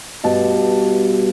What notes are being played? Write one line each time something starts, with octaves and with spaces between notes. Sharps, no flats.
G2 B2 A5